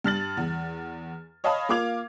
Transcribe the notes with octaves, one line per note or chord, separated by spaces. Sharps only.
G2 F6 A6 F#7
E2
C#5 D#5 F5 A5 B5 D#6
A#3 F4 F5 D6 G#6 F7